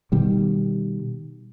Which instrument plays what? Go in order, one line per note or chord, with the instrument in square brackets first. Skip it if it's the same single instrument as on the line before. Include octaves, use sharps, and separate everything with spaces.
[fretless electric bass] B2 D#3 G3